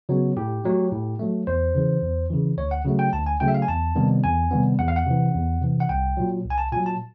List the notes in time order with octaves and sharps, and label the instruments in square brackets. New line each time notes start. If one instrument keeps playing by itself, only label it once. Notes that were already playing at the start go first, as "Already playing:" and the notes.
[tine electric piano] C#3 F#3 B3
A2 G4
F#3 A3
A2
F#3 A3
E2 C5
C#3 E3
E2
C#3 E3
D2 C#5
F#5
C#3 F#3 A3
G5
D2 A5
G#5
C#3 F#3 A3 G5
E5
F5
G#5
E2 A5
C3 D#3 G3 B3
E2 G#5
C3 D#3 G3 B3
E2 F#5
F5
F#5
C3 E3
E2
C3 E3
F#5
C2 G5
A#2 F#3
C2
G#5
A5
A#2 F#3 G#5
A5